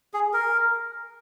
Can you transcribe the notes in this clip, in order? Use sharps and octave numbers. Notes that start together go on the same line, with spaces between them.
G#4
A#4